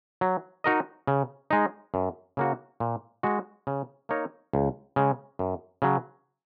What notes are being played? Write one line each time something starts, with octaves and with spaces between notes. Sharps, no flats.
F#3
D#4 F#4 A#4 D#5
C#3
G#3 D#4
F#2
C#3 A#3 F#4
A#2
G#3 F#4 D#5
C#3
A#3 D#4 A#4 C#5
C#2
C#3 G#3
F#2
C#3 F#3